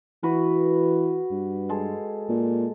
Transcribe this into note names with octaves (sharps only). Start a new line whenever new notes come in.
E3 F#4 B4
G2
G#3 A4
A#2